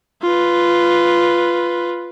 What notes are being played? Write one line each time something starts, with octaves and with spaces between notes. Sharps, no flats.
F4 B4